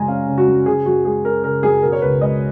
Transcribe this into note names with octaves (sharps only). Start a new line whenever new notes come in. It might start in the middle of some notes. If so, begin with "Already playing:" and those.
Already playing: F#2 C#3 G#3 G#5 A#5
C#4 F5
C#3
F#4
F#2
C#3 G#4
F#2 F#4
G#3 G#4
C#4 A#4
C#3 A#4
F#2 G#4
B2 A#4
C#5
C#2 B4
G#3 D#5